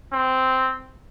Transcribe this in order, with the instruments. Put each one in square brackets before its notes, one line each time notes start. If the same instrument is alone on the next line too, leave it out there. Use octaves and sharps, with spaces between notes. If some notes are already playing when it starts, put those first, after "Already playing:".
[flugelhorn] C4